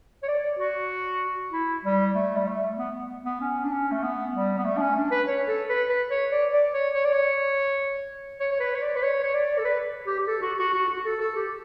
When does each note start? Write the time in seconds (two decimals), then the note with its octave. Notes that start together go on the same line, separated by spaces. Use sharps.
0.23 C#5
0.28 D5
0.59 F#4
1.52 E4
1.85 G3
2.15 A3
2.36 G3
2.47 A3
2.78 B3
3.25 B3
3.40 C#4
3.64 D4
3.72 C#4
3.91 A3
4.03 B3
4.34 G3
4.58 B3
4.65 A3
4.77 D4
4.81 C#4
4.96 D4
5.11 B4
5.28 C#5
5.48 A4
5.69 B4
5.89 B4
6.10 C#5
6.31 D5
6.53 D5
6.73 C#5
6.94 C#5
7.04 D5
7.12 C#5
8.40 C#5
8.52 C#5
8.60 B4
8.75 C#5
8.81 D5
8.95 B4
9.03 C#5
9.23 C#5
9.34 D5
9.58 A4
9.64 B4
10.07 G4
10.19 G4
10.27 A4
10.42 F#4
10.59 F#4
10.74 F#4
10.89 F#4
11.05 A4
11.20 A4
11.35 G4